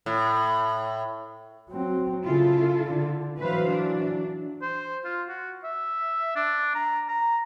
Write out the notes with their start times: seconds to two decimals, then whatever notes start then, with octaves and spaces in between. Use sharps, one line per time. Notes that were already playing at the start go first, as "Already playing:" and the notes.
0.06 A2
1.70 F#3 C4
2.25 C#3 E4 F4 A4
2.85 D3
3.40 E3 F#3 B4 C5 F5
3.71 D4
4.62 C5
5.05 F4
5.28 F#4
5.64 E5
6.35 D4
6.75 A#5
7.09 A#5